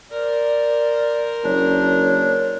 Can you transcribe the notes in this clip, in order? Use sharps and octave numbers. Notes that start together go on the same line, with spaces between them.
A#4 C5 D5
F#1 D4 C#5